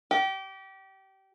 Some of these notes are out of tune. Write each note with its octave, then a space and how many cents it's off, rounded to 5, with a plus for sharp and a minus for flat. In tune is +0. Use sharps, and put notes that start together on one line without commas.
G4 -25